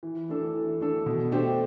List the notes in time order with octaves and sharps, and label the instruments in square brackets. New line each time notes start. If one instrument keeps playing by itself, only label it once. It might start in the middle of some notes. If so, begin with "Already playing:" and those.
[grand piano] E3
A3 D4 A4
E3
A3 D4 A4
B2
A3 D4 G4 C5